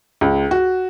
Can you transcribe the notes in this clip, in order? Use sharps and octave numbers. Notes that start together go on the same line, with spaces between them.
C#2
F#4